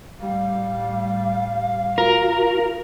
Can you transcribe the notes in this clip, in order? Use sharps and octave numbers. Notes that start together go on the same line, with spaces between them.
A2 G3 F5
F4 F#4 A#4 A#5